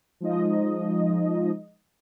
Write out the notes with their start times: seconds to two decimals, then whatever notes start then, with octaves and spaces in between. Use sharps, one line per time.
0.20 F3 G#3 D#4 D#5